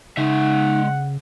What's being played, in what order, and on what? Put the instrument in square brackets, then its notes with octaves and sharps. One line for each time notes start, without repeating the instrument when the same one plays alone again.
[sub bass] C#3 [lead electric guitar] G#3 E5 [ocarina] D#4 [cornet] F#5